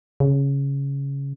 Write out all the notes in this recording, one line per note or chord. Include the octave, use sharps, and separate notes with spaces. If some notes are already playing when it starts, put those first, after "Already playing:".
C#3